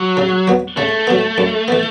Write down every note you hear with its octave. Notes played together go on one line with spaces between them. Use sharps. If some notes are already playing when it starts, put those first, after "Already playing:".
Already playing: F#3
C#3
F#3 B3
C#3 A3
F#3 B3
F#2
E3 B3